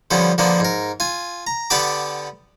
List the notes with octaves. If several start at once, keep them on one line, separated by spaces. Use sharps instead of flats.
D3 F3 G3 B3 C#4
D3 F3 A#3 B3 D4
G#2 A#4
F4 G#5
A#5
D3 B3 G4 A5 B5 D6